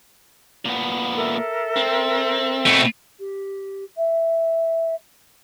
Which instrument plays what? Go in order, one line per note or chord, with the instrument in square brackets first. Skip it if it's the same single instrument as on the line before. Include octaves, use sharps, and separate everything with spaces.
[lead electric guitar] A#2 B3
[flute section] A4 A#4 E5
[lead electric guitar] C4
[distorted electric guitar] B2 A3
[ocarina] G4
E5